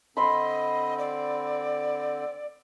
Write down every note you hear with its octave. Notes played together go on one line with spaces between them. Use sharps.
D3 C4 D#5 B5 C6
D5